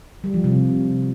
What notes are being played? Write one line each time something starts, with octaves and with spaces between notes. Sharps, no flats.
G3
F3
C3